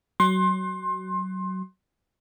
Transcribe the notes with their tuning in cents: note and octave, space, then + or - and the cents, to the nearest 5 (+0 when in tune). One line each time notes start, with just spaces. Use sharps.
F#3 +20 C6 +25